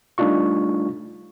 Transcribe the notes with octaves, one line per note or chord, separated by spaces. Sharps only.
G3 A3 D4 D#4 F4 C#6